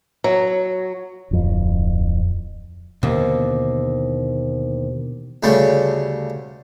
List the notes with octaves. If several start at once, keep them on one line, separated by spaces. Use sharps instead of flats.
F#3
D1 F2
D#2 B2 D3 E3 A#4 C5
D2 C#3 G3 A3